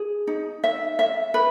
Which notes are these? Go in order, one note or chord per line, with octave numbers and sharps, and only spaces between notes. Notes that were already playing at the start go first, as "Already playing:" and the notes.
Already playing: G#4
D#4
E5
E5
B4